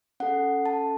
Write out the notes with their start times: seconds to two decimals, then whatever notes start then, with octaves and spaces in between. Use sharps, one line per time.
0.20 C#4 A4 F#5
0.66 A5